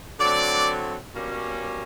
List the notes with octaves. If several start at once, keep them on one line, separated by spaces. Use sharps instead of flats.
D3 F#3 A3 C4 D5
B2 G3 A#3 C#4